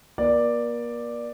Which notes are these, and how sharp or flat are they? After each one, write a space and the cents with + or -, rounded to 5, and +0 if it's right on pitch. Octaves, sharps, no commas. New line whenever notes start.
A#3 +35 D5 +5